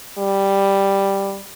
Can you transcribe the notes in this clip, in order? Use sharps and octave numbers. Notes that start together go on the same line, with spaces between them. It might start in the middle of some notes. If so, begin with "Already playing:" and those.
G3